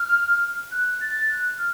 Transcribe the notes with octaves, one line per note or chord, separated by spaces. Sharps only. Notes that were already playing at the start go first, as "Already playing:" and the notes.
Already playing: F6
F#6
A6
F#6
F6